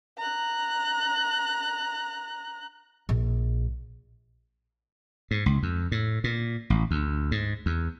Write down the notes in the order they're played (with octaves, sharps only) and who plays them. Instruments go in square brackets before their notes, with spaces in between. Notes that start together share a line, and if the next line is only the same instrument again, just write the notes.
[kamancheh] A#5 F#6
[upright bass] A#1
[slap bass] G#2
C#2
F2
A2
A#2
A1
D2
G#2
E2